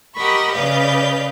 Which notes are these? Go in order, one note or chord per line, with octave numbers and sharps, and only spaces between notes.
G4 A#4 D#5 F#5 B5 C#6
C#3 B4 D5 D#5 F5 G6